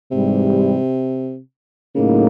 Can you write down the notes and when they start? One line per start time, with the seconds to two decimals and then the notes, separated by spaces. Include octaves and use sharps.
0.11 G#2 C3 E3 G3
1.95 A2 C#3 F#3 A#3 D#4